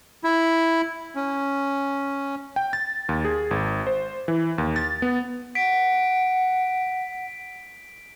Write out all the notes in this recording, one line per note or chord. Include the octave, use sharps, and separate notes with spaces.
E4
C#4
G5
A6
D#2
G#4
G#1
C5
E3
D#2
A6
B3
F#5 B6 D7